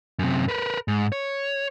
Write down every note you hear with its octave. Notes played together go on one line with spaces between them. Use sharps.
F#2 C3
A#4 B4
G#2
C#5